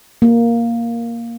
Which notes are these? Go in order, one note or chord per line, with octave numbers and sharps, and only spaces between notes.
A#3